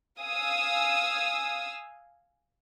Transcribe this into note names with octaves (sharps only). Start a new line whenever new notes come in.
F5 G#5 D#6 E6